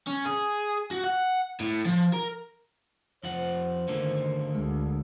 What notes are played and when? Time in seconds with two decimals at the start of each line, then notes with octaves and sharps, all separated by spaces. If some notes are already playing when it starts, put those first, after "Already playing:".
0.08 C#4
0.26 G#4
0.91 F#4
1.04 F#5
1.60 A2
1.85 F3
2.13 A#4
3.23 F2 F4 C5 F#5
3.88 D3 D#3 A3 A#3
4.55 D2 G#3